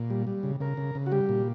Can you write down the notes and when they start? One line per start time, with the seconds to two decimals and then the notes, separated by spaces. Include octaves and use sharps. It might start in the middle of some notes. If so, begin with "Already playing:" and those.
Already playing: A#2
0.10 G3
0.27 G3
0.43 C#3
0.60 C#3 A#4
0.77 C#3
0.95 C#3
1.06 F#4
1.12 G3 G4
1.29 A#2